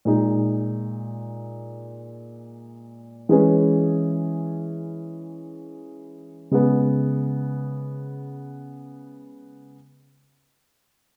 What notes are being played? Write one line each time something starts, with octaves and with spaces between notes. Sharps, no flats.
A#2 G#3 D#4
E3 G#3 C#4 G#4 B4
C#3 G#3 B3